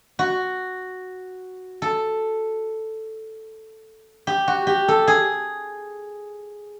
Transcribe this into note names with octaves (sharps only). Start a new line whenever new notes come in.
F#4
A4
G4
F#4
G4
A4
G#4